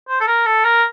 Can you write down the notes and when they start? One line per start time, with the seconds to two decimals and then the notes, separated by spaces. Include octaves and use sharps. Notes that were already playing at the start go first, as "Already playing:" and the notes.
0.09 C5
0.20 A4
0.27 A#4
0.46 A4
0.65 A#4